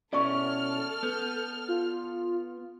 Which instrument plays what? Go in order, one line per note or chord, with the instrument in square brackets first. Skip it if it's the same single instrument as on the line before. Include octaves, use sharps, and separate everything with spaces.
[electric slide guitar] B2 C#4 E4 [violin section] A4 F6 [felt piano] D5 C#6
[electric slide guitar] B3 [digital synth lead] G6
[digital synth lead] F4